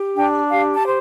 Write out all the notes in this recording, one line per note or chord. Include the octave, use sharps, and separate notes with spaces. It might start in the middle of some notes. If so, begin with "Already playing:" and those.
Already playing: G4
D4 G5
G4 F5
A5
C5